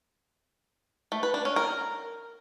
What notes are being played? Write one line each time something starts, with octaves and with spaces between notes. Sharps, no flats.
A3
B4
D4
C#4
A#4